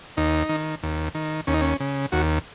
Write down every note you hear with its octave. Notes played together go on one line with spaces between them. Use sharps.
D#2 D#4
D#3
D#2
D#3
D#2 C#4
D#4
C#4
C#3
D#2 F#4